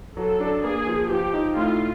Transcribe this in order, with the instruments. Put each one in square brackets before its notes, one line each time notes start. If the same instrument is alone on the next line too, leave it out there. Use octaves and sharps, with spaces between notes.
[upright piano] F#3 [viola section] A4
[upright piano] D4
[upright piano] A#3 [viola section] G#4
[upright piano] F3
[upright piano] F3 [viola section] G4
[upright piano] D#4
[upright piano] A2 [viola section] F4